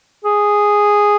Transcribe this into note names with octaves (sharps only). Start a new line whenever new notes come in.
G#4